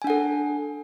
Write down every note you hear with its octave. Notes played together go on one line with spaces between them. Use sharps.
D4 A4 F#5 G#5